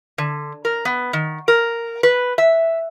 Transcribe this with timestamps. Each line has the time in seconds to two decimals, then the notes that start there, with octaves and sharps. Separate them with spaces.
0.18 D3
0.65 A#4
0.85 B3
1.13 D#3
1.48 A#4
2.03 B4
2.38 E5